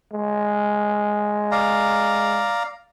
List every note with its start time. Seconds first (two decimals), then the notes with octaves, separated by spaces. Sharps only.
0.12 G#3
1.51 D5 F5 A#5